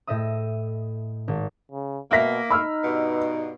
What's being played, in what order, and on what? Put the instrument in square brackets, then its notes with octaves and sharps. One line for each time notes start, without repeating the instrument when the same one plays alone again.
[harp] A2 D#5 E5 D#6
G#1
[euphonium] C#3
[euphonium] B2 [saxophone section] A#3 [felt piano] E5 A#6 B6
[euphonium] D#4 [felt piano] B5 E6 F6
[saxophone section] G2 B2